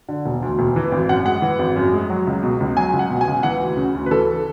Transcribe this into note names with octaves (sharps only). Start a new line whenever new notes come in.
D3
E1
D2
E1
E3
G#1
F#2 F#5
G#3 F#5
E3
G#1
F#2
G#3
F#3
C#2
B2
C#2
F#3 G#5
C#2
F#5
B2
G#5
C#2
E3 F#5
D2
C#3
D2
B4
E3 A4